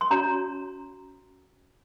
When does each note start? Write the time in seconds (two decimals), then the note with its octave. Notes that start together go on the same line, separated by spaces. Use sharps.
0.01 C6
0.11 C#4 F#4 C#5 A#5